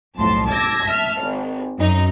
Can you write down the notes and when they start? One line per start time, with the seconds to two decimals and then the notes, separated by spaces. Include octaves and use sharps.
0.18 B1 F2 A2 A5 C6
0.48 A5 D6 E6 G#6 A#6
0.84 E5 A5 F6
1.23 G#1
1.78 F#2 D#4